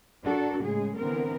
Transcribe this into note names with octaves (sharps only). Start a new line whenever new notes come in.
D4 F#4 A4 A#4
A2 C#3 G#3 G#4
D3 E3 B3 C4 A#4